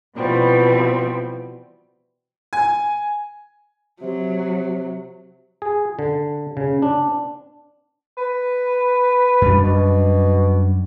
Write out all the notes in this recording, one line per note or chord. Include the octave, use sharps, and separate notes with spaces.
B2 E3 F3 G3 C4
G#5
C3 F#3
G#4
D3
C#3
D4
B4
F#2 G3 D4
B2